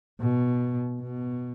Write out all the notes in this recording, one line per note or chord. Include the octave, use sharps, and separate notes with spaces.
B2
B2